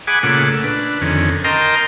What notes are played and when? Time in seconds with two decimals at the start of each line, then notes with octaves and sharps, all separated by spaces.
0.07 G#4 F#5 G#5 B5 D6
0.23 A#2 C#3 A3 F#5 D6
0.52 E6
0.64 D4 B4
1.02 F2 D3 D#3 C#4
1.44 A#4 D#5 G5 A5 A#5 C6